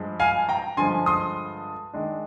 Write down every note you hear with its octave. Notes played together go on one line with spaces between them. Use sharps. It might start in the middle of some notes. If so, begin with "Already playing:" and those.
Already playing: G2 F3 G#3
F5 G#5
G5 A#5
G2 D3 F3 G#3 G#5 C6
C6 D#6
D#3 G#3 D4